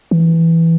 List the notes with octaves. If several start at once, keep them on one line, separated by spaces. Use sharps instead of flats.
E3